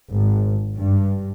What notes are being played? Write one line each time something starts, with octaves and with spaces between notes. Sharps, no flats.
G#1
G2